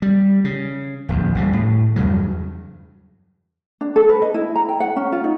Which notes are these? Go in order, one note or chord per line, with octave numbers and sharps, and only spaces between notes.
G3
C#3
D1 A#1 E2
D#1 C#3 G3
A2
E2 G2 C#3 F#3
D4
A4
B4
D#5
E4
A#5
G5
F#5
C#4
F4
D#4